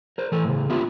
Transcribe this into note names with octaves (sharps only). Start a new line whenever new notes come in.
A#4 C5
E3 A4 G#5
A2 C#3
B3 F4 G4 E5